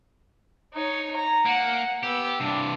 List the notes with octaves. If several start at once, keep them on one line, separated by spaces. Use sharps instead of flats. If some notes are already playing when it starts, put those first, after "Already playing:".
D#4 C#5
A#5
A#3 F#5
B3 G4 E6
G2 C3 D4